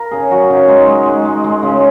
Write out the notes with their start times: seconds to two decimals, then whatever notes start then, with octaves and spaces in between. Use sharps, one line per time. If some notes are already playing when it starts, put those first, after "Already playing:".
Already playing: A#4 F5
0.11 C#3 G#4
0.31 F#3 F#4
0.49 C#3 D#4
0.68 G#3 D#4
0.87 G#3
1.06 G#3
1.25 G#3
1.44 G#3
1.63 C#3